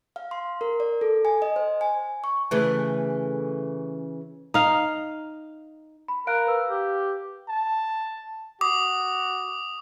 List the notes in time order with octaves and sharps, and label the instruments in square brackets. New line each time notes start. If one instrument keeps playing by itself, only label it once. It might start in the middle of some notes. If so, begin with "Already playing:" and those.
[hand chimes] F5
C6
A#4
D5
A4
G#5
D#5
C5
G#5
C#6
[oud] C#3 E3 A3
[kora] D#4 F5
[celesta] B5
[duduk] A#4 [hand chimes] F5 [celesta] F#6 D7
[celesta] B4 E6
[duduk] G4
[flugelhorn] A5
[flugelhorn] F#4 [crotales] D6 D#6